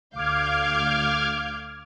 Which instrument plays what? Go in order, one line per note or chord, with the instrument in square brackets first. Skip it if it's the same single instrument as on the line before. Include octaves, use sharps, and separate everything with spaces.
[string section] D2 F5 G6 [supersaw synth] D6 F6 G#6